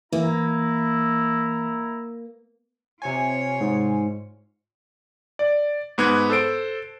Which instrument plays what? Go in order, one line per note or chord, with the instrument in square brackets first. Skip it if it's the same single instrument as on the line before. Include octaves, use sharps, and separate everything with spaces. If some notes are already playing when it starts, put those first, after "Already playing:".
[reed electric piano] E3 [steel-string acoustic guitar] A#3 [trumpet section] E4 A#5
[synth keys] C3 G#5 [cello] F4 C#5
[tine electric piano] G#2
[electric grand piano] D5
G#2 B3 F#6 G#6
A4 C5 D7